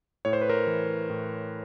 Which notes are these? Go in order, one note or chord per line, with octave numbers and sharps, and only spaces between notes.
A2 C#5
C5
B4
A#4 C5
E3
A2